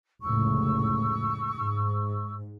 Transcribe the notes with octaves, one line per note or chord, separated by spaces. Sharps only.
F1 C#2 A2 C#6 E6
G#2